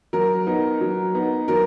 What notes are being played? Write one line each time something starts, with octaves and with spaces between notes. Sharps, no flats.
F#3 A#4
B3 D#4
F#3
B3 D#4
F#3 A#4